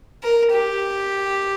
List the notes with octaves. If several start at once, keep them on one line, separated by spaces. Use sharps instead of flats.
A#4
G4